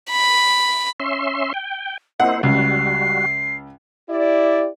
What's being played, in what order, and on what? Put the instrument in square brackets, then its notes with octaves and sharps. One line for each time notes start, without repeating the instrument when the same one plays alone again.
[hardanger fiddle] B5
[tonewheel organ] C#4 E5 C6
G5
[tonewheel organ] A#3 E4 C5 [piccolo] D#5 [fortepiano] F#5
[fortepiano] C#2 [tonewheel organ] G3 F#4 [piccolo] C7
[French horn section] E4 G4 D5